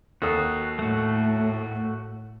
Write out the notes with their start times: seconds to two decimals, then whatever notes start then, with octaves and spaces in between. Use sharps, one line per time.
0.22 D#2 F#4 A4 D#6
0.79 A2 A3 F#4